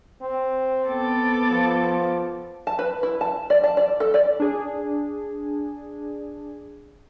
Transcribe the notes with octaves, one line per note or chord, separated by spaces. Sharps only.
C4
B3 A4 D6
F3
A5
B4
E4
A5
D5
A5
D5
A4
D5
D4 G#4